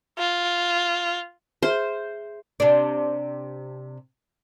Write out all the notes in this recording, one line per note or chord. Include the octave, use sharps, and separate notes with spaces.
F4
G#4 C5 E5 F6
C3 D4